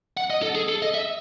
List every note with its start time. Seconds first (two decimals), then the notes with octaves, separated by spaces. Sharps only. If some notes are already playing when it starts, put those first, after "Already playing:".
0.17 F#5
0.30 D#5
0.43 A4
0.55 G#4
0.69 A4
0.82 D#5
0.94 E5